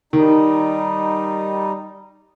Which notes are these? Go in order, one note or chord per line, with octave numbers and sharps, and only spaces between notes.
D#3 G3 D#4